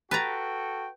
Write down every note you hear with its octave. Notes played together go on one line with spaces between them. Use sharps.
F#4 A4 B4 G5 A5 A#5